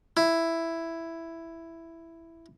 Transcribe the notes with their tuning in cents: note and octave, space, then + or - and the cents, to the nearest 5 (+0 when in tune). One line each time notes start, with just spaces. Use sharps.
E4 +5